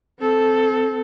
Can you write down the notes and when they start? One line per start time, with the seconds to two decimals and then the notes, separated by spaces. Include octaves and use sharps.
0.20 C4 A4